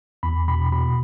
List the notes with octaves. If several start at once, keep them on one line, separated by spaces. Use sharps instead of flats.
E2 B5
B2 B5
B2 B5